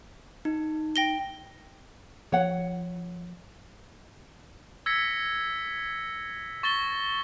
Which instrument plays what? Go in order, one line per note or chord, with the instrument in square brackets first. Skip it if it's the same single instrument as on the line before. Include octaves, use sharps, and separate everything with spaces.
[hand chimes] D#4
[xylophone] G5 A#6 G7
[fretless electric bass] F3 [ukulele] C#5 F#5
[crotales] E6 G#6 A#6 B6 C#7
C#6 A6 A#6 G7